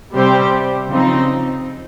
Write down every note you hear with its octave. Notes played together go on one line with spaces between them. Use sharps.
C3 G3 C4 G4 C5
C#3 F3 C4 D#4